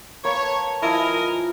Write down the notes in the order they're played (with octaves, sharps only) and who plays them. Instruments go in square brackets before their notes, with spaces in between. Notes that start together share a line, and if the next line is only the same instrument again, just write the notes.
[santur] A#3 B4 A5 [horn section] C#5
[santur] F3 E4 [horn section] A#4 D#5 G#5